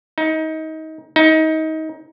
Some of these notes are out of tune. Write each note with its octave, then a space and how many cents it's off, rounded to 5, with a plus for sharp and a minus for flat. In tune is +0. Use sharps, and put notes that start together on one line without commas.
D#4 +25
D#4 +25